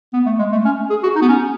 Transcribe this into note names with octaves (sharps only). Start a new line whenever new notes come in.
B3
A3
G#3
A3
C#4
G#4
F#4
D#4
B3
C#4